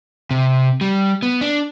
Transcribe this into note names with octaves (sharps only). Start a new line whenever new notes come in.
C3
G3
B3
D4